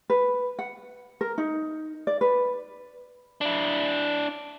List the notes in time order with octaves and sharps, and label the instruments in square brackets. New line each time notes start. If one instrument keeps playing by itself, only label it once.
[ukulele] B4
F#5
A#4
D#4
D5
B4
[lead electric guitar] D4 E4